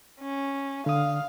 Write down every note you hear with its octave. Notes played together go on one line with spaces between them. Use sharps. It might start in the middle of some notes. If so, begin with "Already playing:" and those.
C#4
D3 F5 D#6